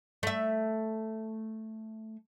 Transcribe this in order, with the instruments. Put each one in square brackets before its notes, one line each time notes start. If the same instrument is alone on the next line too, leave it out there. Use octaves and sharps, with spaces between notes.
[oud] A3 E5